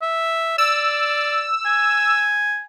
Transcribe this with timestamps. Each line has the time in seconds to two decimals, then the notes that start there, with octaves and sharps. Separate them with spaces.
0.02 E5
0.58 D5 E6
1.66 G#5